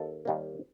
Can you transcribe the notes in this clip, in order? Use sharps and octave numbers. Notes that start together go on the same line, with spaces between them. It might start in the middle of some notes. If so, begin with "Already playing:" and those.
Already playing: D#2 A4
D#2 D#3 G3 A#3